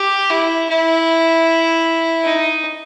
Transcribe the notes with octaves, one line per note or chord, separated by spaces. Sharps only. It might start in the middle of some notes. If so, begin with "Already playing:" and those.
Already playing: G4
E4
E4
D#4